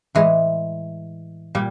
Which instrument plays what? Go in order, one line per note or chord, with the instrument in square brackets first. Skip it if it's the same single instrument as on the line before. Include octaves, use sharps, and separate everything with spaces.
[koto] A2 E3 G#3
A#2 G3